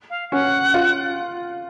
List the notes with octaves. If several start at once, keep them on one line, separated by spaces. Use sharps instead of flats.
F5
C#4 F#5
F4